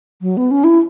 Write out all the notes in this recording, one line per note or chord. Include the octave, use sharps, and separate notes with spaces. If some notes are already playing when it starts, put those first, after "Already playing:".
F#3
B3
C#4
E4